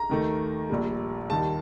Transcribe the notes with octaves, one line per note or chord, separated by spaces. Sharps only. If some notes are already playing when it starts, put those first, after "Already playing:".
Already playing: A#5
D#2 D#3 A3
A#1 A#2 G3
D#2 D#3 G3 A5